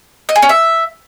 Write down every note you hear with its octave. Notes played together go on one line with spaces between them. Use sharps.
D#5
G#4
C#4
E5